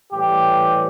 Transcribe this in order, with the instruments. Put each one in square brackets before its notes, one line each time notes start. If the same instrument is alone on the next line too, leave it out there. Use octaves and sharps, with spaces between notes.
[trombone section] A2 E3 G3 G4